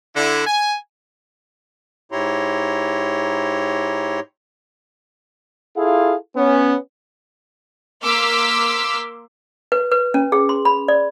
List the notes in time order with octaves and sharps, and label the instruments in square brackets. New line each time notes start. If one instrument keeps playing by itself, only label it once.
[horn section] D3 E4
G#5
[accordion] G#2 E4 G4 C#5 A#5 C6
[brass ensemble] E4 F4 G#4 A4 F5
B3 C#4
[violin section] A#3 C6 D6 E6 F6 B6
[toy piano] B4
B4
C#4
G#4
C6
B5
D5